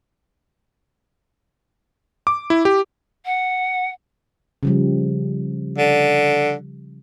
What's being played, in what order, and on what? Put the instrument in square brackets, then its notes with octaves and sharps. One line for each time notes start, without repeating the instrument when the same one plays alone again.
[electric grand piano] D6
E4
G4
[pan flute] F#5
[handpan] C#3 F3 G3
[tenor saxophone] D3